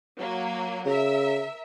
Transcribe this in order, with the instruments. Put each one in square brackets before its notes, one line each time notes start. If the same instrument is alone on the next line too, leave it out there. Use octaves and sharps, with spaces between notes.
[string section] F#3 A#3
[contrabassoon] C#3 [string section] A#4 E5